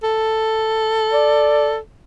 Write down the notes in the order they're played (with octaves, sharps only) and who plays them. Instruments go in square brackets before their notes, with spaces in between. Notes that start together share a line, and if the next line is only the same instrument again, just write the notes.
[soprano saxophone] A4
[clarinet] D5